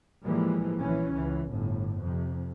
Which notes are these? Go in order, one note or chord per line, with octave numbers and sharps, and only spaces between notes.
A2 E3 F3 G3 G#3 A#3
A#1 E3 C#4
C#2 E3
G1 A2
F2 C3